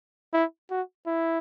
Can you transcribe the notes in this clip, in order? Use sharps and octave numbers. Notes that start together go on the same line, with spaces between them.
E4
F#4
E4